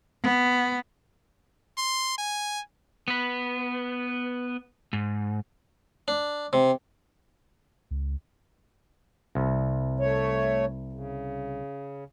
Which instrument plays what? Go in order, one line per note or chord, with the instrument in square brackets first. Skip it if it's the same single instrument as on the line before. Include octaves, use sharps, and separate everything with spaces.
[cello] B3
[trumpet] C6
G#5
[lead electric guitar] B3 B4
G#2
[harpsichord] D4
C3
[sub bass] C#2
[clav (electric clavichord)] C2
[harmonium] A3 C#5
C#3